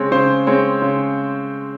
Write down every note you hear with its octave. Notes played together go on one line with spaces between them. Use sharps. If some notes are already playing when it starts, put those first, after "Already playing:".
Already playing: C#3 G#3 C4 C#5
C#3 C5
G#3 C4 C#5
C#3